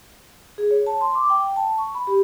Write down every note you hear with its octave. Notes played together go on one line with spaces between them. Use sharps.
G#4
C#5
A5
C6
D6
G5
A5
C#6
B5
G4